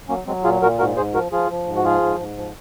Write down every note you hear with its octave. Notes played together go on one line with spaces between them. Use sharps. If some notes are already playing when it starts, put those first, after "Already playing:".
F#3 A#3 C#4
F#3 G#3 C4
A#2 F4 G#4
A#2 F#4 A#4
G#2 F#4 A#4
G#2 G#4 C5
F3 F#4 A#4
F3 F4 G#4
F3
G#2
F#4
F3 F4 G#4
G#2
G#2
F3